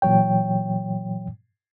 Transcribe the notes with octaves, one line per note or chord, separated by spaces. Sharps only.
A#2 E3 F#3 C#5 G5